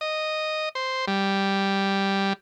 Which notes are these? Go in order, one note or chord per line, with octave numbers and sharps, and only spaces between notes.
D#5
C5
G3